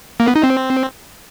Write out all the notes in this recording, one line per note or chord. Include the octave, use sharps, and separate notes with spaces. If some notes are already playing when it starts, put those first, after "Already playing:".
A#3
B3
D#4
C4